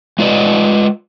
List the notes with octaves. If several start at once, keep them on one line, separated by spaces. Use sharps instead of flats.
G#3 F4 B4 D5 D#5